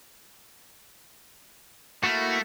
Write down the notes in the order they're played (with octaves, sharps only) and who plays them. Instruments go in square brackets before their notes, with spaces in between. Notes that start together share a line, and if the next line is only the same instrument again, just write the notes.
[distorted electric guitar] A3 [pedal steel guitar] A#3 E4 F#4